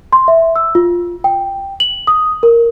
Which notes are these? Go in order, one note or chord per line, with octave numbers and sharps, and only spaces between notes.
C6
E5
E6
F4
G5
F#7
D#6
A#4